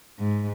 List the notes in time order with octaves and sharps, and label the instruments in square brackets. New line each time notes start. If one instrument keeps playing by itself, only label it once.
[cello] G#2